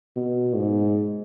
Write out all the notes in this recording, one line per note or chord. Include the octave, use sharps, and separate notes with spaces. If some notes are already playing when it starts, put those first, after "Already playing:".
B2
G#2